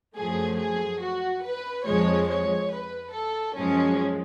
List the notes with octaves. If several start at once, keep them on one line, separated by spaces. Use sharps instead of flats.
F#2 F3 A3 G#4
G#4
F#4
B4
F2 F3 G#3 C#5
C#5
B4
A4
F#2 F3 G#3 C#4